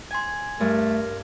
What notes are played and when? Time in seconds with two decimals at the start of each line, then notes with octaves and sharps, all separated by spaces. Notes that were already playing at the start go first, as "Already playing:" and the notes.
0.11 G#5 C6 G#6
0.60 G2 A3 A#4